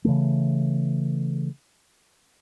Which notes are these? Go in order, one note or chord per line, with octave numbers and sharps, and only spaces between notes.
C#3 E3 A3